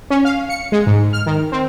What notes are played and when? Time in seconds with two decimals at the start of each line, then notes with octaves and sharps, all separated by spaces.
0.10 C#4
0.25 F5
0.49 C#7
0.72 G#3
0.87 G#2
1.13 F6
1.26 D#3
1.52 C4